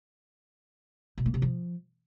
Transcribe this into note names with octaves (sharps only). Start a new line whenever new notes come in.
B2
A#3
C3
F3